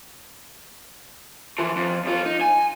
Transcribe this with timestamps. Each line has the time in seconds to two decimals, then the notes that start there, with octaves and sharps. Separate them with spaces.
1.58 E3 F3
1.76 F2
2.05 F#2 F4
2.26 D#4
2.41 G#5